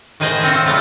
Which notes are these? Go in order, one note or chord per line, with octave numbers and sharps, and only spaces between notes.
A2 D#3 G#4 B4 C5 D#5
C4 F4 C5 C#5 E5
F#3 G3 A3 B3 F4